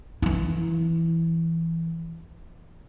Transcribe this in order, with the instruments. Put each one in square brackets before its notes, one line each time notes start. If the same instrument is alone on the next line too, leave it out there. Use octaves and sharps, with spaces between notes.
[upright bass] E3 E4